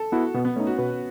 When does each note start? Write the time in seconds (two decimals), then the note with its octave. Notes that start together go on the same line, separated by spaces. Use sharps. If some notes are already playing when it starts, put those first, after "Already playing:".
Already playing: A4
0.12 B3 E4 F#4
0.34 B2 B3
0.45 B3
0.56 A3 C#4 D#4
0.67 F#4
0.78 B2 B4